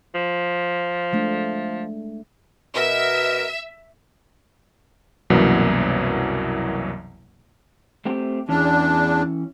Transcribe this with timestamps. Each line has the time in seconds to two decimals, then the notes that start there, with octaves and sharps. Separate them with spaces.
0.15 F3
1.13 G#3 A3 D4
2.75 B2 A#4 E5
5.30 C2 F#2 B2 E3 F#3 A#3
8.05 A3 C4 G4
8.49 E2 E3 C#4 D4